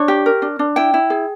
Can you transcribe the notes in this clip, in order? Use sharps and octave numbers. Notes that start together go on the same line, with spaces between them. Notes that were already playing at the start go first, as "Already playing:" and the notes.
Already playing: D4 C#5
G4
A#4
D4
D4
E4 G5
E4
G#4